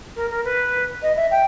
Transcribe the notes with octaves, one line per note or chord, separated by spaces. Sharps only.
A#4
A#4
B4
D#5
E5
G5